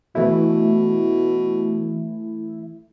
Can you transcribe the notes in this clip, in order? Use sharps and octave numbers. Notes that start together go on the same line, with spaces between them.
B2 E3 A3 E4